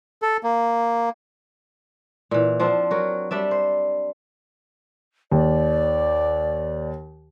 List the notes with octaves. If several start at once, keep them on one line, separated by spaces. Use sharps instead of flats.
A4
A#3
A#2 E3
F3 C4 D4 F4
F#3 F#4 A#4
G3 D4 D5 E5
C5
D#2 D5